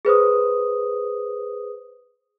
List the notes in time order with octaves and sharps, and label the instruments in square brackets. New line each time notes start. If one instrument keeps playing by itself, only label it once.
[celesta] G#4 B4 C5 D#6